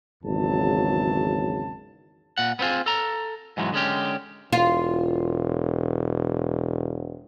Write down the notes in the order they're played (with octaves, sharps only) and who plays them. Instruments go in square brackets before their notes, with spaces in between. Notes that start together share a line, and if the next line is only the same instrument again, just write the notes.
[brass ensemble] G#1 E2 C#3 F#3 A5
[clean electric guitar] A#2 F#5
B3 C4 F4 G#4
A4 A#5
G#2 E3 F#3 G#3
D3 G#3 C#4 G4
[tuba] E1 [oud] F4